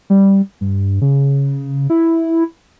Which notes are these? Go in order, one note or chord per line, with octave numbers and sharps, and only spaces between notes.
G3
G2
C#3
E4